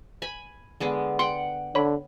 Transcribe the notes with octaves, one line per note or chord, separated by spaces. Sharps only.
G#5 B5
D3 G#3 B3
F#5 G5 C6
D3 C#5 B5